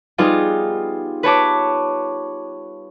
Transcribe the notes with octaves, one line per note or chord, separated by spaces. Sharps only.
G3 B3 D#4 F4 G#4
B4 C#5 A5 D6